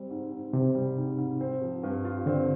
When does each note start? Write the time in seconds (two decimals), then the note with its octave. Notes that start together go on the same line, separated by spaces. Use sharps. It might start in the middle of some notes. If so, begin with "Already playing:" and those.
Already playing: G3 C4
0.10 G#2
0.32 G#2
0.53 C3 C4
0.75 G3
0.97 G#2
1.18 G#2
1.41 C4
1.61 F3
1.83 G2
2.05 F4
2.26 D3 C4